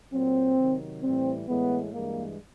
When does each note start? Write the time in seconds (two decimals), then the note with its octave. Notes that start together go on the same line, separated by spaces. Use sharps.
0.13 A#2 F#3 C4
0.58 C3 D#3 F#3
1.03 A2 E3 G3 C4
1.48 A2 E3 G#3 B3
1.93 G2 E3 G#3 A#3